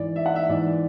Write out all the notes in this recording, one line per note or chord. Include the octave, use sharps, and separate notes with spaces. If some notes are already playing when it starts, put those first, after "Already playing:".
Already playing: G#2 E3 D5
E5
F#5
E5
G#2 E3 D5